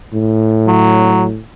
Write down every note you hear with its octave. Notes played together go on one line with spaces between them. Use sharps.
A2
F#3